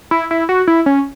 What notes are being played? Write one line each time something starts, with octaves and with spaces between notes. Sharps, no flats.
E4
E4
F#4
E4
C#4